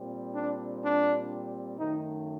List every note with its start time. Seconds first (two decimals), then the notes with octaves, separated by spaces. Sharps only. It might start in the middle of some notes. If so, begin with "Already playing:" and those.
Already playing: A#2 G3 C4
0.34 D4
0.83 D4
1.78 F#2 D#3 A3 D#4